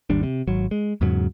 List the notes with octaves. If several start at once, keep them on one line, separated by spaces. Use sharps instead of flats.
G#1 D#2 G3 D4
C3
G#1 F#3
G#3
E2 G#2 C#3 F#3